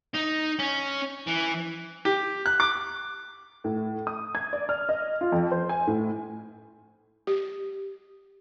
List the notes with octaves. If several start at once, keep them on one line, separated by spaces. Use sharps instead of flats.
D#4
C#4
E3
G4
F#6
D6
A2
D#6
G#6
D5
F6
D#5
F4
F2
C5
G#5
A2
G4